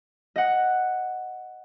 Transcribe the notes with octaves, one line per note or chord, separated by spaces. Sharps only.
D#5 F#5